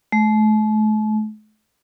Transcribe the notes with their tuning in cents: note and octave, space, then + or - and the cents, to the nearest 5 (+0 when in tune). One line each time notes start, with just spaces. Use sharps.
A3 -40